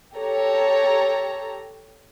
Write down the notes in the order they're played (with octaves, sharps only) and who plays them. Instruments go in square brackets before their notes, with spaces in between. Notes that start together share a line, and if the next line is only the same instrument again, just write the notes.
[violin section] G4 A4 C#5 A#5